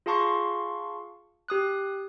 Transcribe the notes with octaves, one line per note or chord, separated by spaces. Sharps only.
F4 G#4 F5 A5 C6 C#6
G4 D#6 F#6